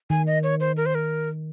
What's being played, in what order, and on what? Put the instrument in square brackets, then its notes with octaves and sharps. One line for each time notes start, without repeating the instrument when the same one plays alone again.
[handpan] D#3 [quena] G#5
[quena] D#5
C#5
C5
A#4
C5
A#4